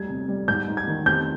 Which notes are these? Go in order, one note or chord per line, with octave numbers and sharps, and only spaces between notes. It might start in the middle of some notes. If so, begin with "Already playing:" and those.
Already playing: G3 G#6
C3
G3
G#2 G6
G#2
G#6
D#3
C4 G6